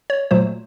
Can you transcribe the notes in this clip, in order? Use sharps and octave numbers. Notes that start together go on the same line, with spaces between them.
C#5
A#2 F#3 A3 C5